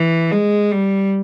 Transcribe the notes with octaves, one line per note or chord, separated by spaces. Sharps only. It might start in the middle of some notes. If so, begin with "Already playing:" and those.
Already playing: E3
G#3
G3